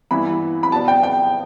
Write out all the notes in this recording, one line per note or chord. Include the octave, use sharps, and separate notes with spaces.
G2 E3 B3 E4 B5
B5
B2 B3 D4 A5
G5
G5